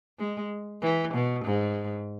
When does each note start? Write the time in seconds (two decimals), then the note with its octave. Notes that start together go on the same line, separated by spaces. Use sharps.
0.19 G#3
0.82 E3
1.14 B2
1.45 G#2